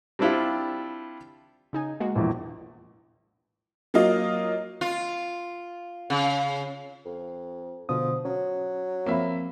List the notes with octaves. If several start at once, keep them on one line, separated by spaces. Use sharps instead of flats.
G3 C4 D4 E4 F4 G4
C#3 D#4 G#5
G#3 A#3 F#4
A#1 E2
F#3 A#3 F4 D#5
F4
C#3
F2
B2 D3 F3 D#6
F#3 C#4
F3 A#3 C4 E5 B5